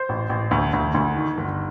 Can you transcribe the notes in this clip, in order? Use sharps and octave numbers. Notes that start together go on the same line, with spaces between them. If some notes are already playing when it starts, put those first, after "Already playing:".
Already playing: C5
A1
A1
D2
D2
D2
D#3
G1